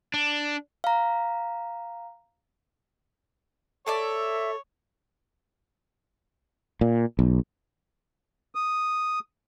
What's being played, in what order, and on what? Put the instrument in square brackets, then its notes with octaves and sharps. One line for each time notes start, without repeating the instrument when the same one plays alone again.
[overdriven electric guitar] D4
[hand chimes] F5 A#5
[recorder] A4 [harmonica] C#5 [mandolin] D5 E5 A5
[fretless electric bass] A#2
B1
[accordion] D#6